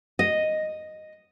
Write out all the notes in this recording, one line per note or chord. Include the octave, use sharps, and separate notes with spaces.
D#5